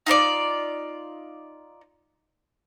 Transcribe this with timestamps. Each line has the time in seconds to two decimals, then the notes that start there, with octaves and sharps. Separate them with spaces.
0.06 D#4 F4 C5 D5